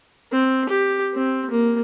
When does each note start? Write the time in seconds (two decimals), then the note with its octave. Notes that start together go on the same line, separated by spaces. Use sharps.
0.32 C4
0.69 G4
1.14 C4
1.50 A#3